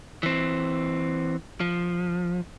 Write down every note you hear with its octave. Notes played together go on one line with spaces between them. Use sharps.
E3 C4
F3